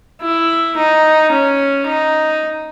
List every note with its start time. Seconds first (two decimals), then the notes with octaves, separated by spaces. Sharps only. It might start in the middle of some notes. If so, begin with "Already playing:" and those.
0.22 E4
0.77 D#4
1.32 C#4
1.87 D#4